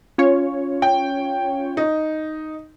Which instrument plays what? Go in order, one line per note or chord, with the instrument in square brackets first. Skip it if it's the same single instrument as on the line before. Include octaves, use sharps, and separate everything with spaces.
[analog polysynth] C#4 F4 C#5
[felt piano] G5
D#4